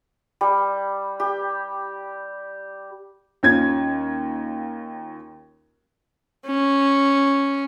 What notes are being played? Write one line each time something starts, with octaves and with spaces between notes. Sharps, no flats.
G3
G4
D#2 C#4 F4 G#6
C#4